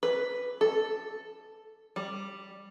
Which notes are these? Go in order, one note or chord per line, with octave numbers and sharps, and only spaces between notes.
B4
A4
G3